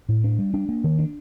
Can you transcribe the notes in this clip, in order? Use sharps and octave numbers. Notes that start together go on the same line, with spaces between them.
A2
D4
G3
D4
A#3
D#3
D4